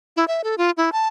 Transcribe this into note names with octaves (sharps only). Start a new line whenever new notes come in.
E4
E5
A4
F4
E4
A5